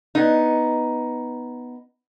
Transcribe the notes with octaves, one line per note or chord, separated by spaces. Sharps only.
B3 D#4